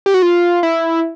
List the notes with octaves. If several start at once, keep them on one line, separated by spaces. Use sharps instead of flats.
G4
F#4
F4
E4